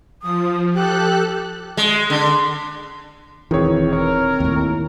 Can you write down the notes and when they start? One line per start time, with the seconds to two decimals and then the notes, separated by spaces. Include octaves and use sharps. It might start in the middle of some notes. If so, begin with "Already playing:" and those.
0.23 F3 D#6
0.74 G4 A4 F#6
1.77 G#3
2.10 D3
3.51 E1 D#3 E3 C4 G#4 C#5
3.93 A#4 C#5
4.40 D#2 A2